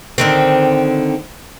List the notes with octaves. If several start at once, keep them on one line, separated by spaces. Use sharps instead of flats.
D3 D#3 C4